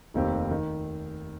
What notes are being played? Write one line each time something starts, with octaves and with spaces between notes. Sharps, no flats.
F1 D#2 D#3 C4 G4
D#3